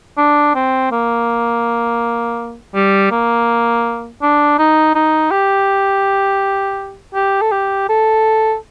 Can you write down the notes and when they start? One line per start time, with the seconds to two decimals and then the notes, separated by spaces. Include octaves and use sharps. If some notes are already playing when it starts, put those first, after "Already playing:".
0.17 D4
0.55 C4
0.92 A#3
2.75 G3
3.11 A#3
4.22 D4
4.59 D#4
4.95 D#4
5.31 G4
7.14 G4
7.41 A4
7.52 G4
7.89 A4